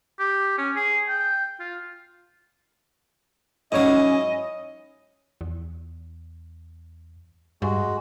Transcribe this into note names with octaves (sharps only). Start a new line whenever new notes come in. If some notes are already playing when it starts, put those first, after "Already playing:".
G4
C#4
G#4
G5
F4
G#2 F#3 C#4 E4 C#5 D#5 F5
E2
G2 G#3 F#4